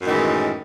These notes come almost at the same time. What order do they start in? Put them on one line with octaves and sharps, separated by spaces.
F#2 A2 D#3 E3 G#3